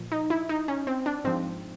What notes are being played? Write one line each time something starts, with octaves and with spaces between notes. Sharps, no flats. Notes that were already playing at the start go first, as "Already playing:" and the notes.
Already playing: A#2 F3
D#4
E4
D#4
C#4
C4
D4
G#2 F3 C4